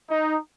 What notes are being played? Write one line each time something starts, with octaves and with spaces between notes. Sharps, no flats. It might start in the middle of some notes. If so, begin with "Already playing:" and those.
D#4